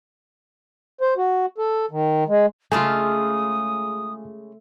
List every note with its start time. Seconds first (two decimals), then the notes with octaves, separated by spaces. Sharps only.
1.01 C5
1.17 F#4
1.58 A4
1.91 D#3
2.28 G#3
2.72 C#3 G#3 A3 F4 G#5 A5 D#6 F6